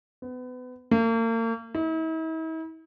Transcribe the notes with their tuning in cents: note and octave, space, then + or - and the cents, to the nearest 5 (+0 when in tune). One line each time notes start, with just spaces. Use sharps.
B3 +30
A#3 -40
E4 -45